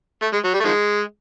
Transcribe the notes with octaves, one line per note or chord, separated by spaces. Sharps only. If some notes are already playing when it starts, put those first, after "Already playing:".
A3
G#3
F#3
G3
A3
D#3 F3 G#3